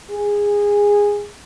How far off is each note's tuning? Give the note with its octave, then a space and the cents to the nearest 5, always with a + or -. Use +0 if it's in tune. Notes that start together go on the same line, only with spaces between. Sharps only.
G#4 -15